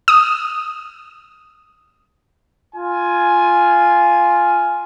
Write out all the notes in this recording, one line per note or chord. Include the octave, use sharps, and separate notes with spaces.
D#6
F4 G#5